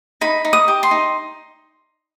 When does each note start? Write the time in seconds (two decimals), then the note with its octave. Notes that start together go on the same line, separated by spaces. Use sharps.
0.21 D#4 B5
0.45 D#4
0.53 D#6
0.68 G4
0.83 C6
0.91 D#4